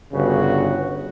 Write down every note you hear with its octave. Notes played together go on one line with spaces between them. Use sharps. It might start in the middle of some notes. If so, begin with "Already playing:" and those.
G1 C#3 F#4